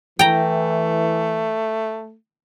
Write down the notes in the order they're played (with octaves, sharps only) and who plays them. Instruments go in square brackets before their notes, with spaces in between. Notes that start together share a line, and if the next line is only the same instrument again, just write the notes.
[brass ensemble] E3 [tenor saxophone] A3 [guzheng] G5 A#5